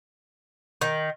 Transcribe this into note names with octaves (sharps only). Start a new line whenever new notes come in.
D#3